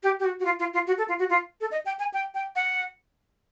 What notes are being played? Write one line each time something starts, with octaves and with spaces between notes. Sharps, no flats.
G4
G4
F#4
F#4
F4
F4
F4
F#4
A4
F4
F#4
F4
A4
D#5
G5
G#5
G5
G5
F#5